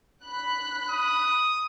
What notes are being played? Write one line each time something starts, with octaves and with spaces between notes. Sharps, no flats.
B5 F#6
D#6